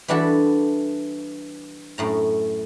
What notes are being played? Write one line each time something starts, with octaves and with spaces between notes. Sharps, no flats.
E3 G3 D4 E4 F#4 A4
F#2 A2 A#5